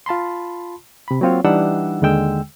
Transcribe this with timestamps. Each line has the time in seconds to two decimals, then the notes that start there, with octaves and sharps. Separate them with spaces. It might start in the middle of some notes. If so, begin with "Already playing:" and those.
0.06 F4 A5 B5 C6
1.08 C3 B5
1.21 F#3 A#3 C4 F4 C#5
1.45 E3 G3 D4 D#4 F#5 E6
2.02 D#2 D3 G#3 G5 E6